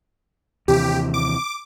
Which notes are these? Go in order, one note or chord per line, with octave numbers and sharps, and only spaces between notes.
D#2 C3 E3 G4
D6